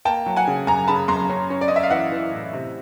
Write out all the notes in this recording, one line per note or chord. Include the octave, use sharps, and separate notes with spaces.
A#3 G5 A5
F#3
F#5 G#5
C#3
F#2 G#5 A#5
C#3 A5 B5
F#2 A#5 C6
C#4
C#4
D5
C#4 D#5
E5
F5
E3 E5 F#5
E3
A2
C3